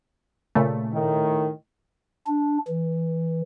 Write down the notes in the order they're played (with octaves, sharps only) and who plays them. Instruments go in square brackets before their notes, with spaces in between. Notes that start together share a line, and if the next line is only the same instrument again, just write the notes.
[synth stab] A#2 C#3 A3
[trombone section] A2 D#3
[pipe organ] D4
E3